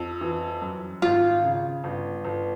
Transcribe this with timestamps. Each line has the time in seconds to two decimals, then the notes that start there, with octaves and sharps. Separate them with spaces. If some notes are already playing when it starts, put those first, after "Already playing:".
Already playing: F2
0.21 E3
0.62 F#2
1.02 G#1 F4
1.43 C#3
1.84 G1
2.25 G1